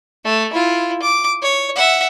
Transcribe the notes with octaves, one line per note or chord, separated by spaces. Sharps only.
A3
E4 F4
D6
C#5
E5 F#5